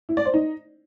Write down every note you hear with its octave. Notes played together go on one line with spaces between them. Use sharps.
E4
D5
C5
D#4